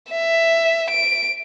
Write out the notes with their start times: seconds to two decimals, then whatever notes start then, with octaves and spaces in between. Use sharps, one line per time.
0.11 E5
0.90 D7